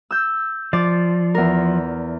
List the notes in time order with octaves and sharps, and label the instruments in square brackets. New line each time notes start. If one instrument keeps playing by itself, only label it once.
[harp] E6 G6
[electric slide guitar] F3 [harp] D5
[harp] E2 A#4